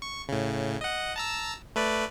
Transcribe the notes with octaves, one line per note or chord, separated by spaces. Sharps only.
C#6
A2 C#3
D#5 F#5
A5 A#5 E6
A3 B4 D5